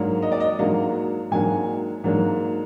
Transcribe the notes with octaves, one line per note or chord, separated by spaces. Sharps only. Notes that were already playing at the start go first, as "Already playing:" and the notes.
Already playing: G#2 F#3 A#3 D4
D#5
D5
D#5
G#2 F#3 A#3 D4 F5
G#2 F#3 A#3 D4 G#5
G#2 F#3 A#3 D4